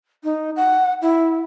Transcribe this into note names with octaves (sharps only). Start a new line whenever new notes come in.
D#4
F#5
E4